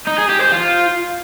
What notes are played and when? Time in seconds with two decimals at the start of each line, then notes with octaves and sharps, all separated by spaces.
0.07 D#4
0.18 G#4
0.29 G4
0.41 C5
0.52 F4